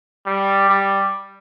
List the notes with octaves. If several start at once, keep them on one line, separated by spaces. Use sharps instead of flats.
G3
G3